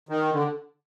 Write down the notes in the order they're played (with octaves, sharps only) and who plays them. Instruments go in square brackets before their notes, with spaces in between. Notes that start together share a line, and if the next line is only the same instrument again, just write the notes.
[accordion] D#3
D3